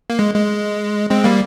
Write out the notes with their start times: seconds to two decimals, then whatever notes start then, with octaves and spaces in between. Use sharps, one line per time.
0.10 A#3
0.19 G#3
0.34 G#3
1.10 G#3 C4
1.24 G3 A#3